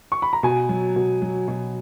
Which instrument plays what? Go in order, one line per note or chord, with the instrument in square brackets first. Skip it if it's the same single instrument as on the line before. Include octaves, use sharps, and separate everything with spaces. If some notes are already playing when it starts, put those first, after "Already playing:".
[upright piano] C#6
B5
A#5
B2 G#5
F#3
B2
F#3
B2